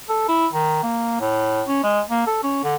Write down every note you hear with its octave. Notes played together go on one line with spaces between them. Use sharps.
A4
E4
D#3
A#3
A2
C#4
G#3
A#3
A4
C#4
D3